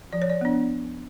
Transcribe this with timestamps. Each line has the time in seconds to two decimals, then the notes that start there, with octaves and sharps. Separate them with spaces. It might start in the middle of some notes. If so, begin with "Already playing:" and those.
0.13 F3 D5
0.22 C#5
0.30 D5
0.41 B3 D4